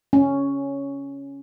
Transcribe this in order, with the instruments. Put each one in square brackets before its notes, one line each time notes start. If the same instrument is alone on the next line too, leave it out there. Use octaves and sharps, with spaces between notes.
[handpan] C#4